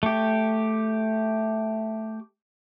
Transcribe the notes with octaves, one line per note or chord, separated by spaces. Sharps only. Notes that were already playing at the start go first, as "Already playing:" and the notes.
A3 G4